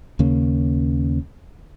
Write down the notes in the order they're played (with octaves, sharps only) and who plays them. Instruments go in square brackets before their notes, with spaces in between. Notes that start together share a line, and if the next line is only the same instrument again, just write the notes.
[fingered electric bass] D#2 C#3 A#3 C#4